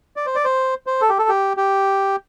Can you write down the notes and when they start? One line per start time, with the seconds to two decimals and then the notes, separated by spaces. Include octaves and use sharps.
0.16 D5
0.26 C5
0.35 D5
0.45 C5
0.87 C5
1.01 A4
1.10 G4
1.19 A4
1.29 G4
1.57 G4